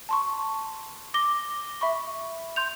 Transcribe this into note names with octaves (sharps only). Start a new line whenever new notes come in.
A5 C6 C#6
D6 A#6 G7
E5 B5 C#6
C6 G6 F7